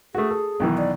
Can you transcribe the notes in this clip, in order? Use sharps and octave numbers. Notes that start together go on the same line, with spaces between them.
A3 F#4 G#4
A4
B1 D#3 E3
D5